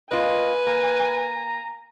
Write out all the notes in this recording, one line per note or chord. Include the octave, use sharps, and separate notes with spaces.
A#3 F4 B4 D#5 G#5
A#3 A#5